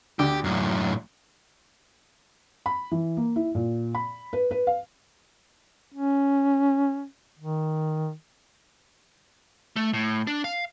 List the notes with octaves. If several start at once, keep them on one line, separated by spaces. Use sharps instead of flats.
D2 D3 G4 D6
F#2 A2
B5
E3
A#3
E4
A#2
B5
B4
B4
F5
C#4
D#3
A3
A2
D4
F5